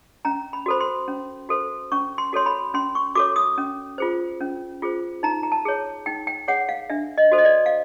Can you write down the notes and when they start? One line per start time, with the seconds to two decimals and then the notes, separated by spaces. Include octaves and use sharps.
0.25 C#4 A#5
0.53 B5
0.66 F#4 A4 C5 B5
0.80 C6
1.08 C#4
1.49 F#4 A4 C5
1.92 C#4 C#6
2.18 C6
2.33 F#4 A4 C#5 C6
2.46 B5
2.74 C#4 C6
2.95 C#6
3.15 F#4 A4 C#5 D6
3.36 D#6
3.58 C#4
3.98 F4 G#4 C5
4.41 C#4
4.82 F4 G#4 C5
5.23 D#4 A#5
5.43 A#5
5.52 A5
5.65 G#4 C#5
6.06 D#4 G5
6.27 G5
6.48 G#4 C#5 F#5
6.69 F5
6.90 D4 E5
7.18 D#5
7.32 F#4 A4 C5
7.38 D#5
7.45 D5
7.66 F5